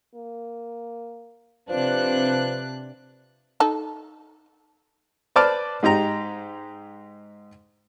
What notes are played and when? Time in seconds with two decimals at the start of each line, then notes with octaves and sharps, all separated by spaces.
0.15 A#3
1.69 C3 F3 D4 B4 F#6
3.60 D#4 A4
5.36 B4 C5 D5 A5 D6 F6
5.83 G#2 D#4 G4 A#5